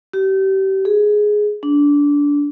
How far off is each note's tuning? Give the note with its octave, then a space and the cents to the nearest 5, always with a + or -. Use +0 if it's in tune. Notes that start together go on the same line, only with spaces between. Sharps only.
G4 -30
G#4 +10
D4 -20